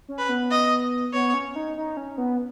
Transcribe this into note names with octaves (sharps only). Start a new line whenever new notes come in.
C#4
B4
B3
D#5
B3 C#5
C#4
D#4
D#4
C#4
B3